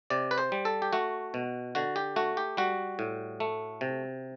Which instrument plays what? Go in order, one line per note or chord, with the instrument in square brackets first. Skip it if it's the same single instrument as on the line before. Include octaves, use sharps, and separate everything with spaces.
[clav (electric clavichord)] C3 D5
B4
C5
G3
A4
G4
A3 F#4
B2
D3 F#4
G4
A3 F#4
G4
G3 F#4
A2
A3
C3